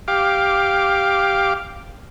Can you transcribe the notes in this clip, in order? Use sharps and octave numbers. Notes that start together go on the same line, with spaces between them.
G4 F5 D6